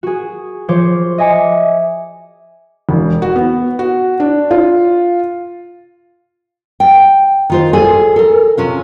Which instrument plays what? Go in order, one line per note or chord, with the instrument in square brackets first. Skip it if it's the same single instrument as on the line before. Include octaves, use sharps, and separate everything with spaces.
[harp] F#4 G#4
F3 C5 C#5 D6
D#5 E5 G#5 D6 C#7
[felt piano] E1
F#4
B3
F#4
D4
F4
[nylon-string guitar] G5
D#3 F4 C5
G#4 A4 D5 G#5
A4 A#4
C3 C#4 F4